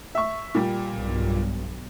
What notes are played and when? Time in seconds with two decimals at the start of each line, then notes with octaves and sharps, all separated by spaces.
0.15 E5 C#6
0.55 A#2 G3
0.95 B1 G2